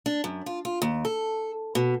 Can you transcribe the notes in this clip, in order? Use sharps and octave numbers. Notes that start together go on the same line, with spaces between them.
D4
F#2
F4
F4
D#2
A4
B2